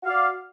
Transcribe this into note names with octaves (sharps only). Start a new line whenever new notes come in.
F#4 D5 F5